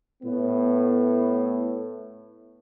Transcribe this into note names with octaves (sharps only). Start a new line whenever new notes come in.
A2 B3